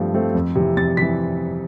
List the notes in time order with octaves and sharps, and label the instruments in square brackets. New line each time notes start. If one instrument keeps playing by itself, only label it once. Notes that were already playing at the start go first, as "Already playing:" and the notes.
Already playing: [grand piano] G2 F3 A3 C4
F3 A3 C4
F2
C3 E3
F2 A6
C3 E3 B6